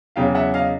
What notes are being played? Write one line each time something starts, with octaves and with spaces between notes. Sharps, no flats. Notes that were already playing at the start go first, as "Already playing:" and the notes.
E2 C#3 F#3 F5 G5
E5 F#5
D#5 F5